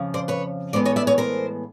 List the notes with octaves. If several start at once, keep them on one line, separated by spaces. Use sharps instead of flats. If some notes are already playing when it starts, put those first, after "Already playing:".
Already playing: F2 C#3 F3
C5 D5
B4 C#5
A2 E3 G#3 B3 C5 D5
C#5 D#5
D5 E5
C#5 D#5
A#4 C5